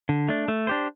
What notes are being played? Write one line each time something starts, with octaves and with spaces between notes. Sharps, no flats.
D3
A3 D4
A3
D4 G4 C5